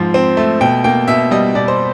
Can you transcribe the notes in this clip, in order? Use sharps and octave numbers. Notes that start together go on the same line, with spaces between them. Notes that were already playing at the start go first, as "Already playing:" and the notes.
Already playing: G#2 F3 C4
C4
A3
B2 G5
A#3 G5
B2 E5
G3 D#5
B2 D5
C5